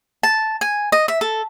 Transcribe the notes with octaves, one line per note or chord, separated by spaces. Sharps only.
A5
G#5
D#5
E5
A4